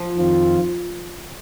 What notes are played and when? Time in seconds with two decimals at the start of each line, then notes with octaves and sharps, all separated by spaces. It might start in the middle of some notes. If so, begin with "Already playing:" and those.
Already playing: F3
0.16 F2 D#3 C4 F4